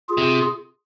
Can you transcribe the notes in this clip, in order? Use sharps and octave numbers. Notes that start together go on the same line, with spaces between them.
F4 G#4
C3